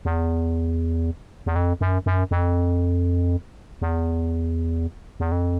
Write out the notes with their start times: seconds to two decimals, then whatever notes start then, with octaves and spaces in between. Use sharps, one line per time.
0.05 E2
1.46 E2
1.56 F2
1.81 F#2
2.06 F#2
2.31 F2
3.82 E2
5.20 E2
5.32 F2